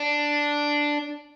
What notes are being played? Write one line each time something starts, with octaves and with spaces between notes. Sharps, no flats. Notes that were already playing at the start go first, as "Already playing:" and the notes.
Already playing: D4